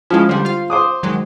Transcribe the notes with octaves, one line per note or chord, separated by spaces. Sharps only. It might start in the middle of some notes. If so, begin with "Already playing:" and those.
F3 G#3 C#4 E4
D3 G3 C5
F4 F5
C5 D6 D#6
D#3 F#3 G#3